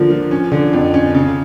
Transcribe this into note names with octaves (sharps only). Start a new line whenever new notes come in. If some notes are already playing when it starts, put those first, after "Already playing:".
Already playing: D3 F3 A#3
F3
C#4
D3
F2
C#4
C#3